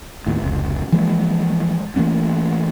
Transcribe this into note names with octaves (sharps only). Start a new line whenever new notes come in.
D#2 A2
F1 C#2
E3 F3 G#3 A#3
E3 A3 A#3 C#4